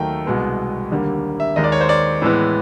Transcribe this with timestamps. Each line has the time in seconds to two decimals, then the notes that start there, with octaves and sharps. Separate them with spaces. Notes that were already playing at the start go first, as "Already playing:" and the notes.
Already playing: D#2 D#3 F#3 A3 G5
0.26 C2 B2 G#3 B3
0.91 D#2 D3 G3 A#3
1.40 E5
1.56 D#2 D#3 G#3 D#5
1.64 D5
1.72 C#5
1.81 C5
1.89 D5
2.22 A2 E3 G#3 B3